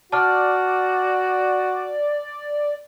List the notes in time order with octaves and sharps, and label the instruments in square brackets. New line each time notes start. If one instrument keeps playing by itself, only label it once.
[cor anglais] F#4 [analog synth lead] D5 [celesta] A5 F6